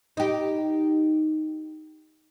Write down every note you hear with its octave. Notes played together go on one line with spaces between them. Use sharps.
D#4 G4